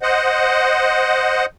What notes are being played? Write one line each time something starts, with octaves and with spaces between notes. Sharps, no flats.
C5 D#5 F#5